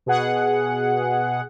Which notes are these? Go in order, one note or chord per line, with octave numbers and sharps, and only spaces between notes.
B2 G#4 F#5